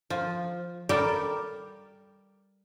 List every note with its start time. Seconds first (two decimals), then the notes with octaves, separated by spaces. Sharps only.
0.10 F3
0.89 G3 G4 A4 A#4